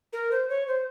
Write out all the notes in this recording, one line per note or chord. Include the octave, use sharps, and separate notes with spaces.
A#4
C5
C#5
C5